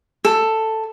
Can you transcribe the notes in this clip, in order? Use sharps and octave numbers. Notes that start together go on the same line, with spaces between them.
A4